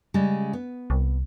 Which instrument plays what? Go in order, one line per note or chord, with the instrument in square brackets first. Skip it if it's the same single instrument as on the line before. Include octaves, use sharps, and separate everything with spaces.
[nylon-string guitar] C#3 G3 G#3
B3
[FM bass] C2